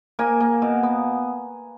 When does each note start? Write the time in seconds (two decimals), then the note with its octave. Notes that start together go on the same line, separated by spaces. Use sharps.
0.19 A#3 G#5
0.40 A#3
0.62 B2
0.83 B3